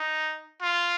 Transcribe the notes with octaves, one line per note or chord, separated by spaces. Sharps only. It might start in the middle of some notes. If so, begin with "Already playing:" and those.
Already playing: D#4
F4